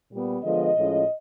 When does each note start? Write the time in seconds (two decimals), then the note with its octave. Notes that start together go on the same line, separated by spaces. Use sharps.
0.11 A#2 G3 B3
0.44 D3 F3 G#3 B3 D#5
0.76 A2 F3 G#3 C#4